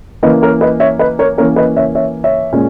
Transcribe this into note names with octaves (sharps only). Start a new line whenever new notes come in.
E3 A#3 C#4 B4 D#5
A#4 C#5
B4 D#5
C#5 E5
B4 D#5
A#4 C#5
E3 A#3 C#4 A#4 C#5
B4 D#5
C#5 E5
C#5 E5
C#5 E5
A#2 G#3 C#4